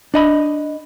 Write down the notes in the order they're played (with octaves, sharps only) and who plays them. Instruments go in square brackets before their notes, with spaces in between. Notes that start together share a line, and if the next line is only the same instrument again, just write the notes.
[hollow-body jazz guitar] D4 D#5 B5